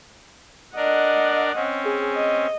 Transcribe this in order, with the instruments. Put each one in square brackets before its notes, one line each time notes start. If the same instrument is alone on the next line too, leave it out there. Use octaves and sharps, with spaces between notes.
[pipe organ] D4 A#4 D5 [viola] D#5 F#5
[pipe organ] C4 C#4
[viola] G#4
D#5